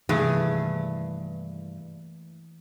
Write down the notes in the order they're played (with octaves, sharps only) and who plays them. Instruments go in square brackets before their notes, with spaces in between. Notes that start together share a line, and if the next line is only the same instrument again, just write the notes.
[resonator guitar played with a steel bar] G2 [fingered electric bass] C3 D#3 [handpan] E3 A#3 [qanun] A3 G#4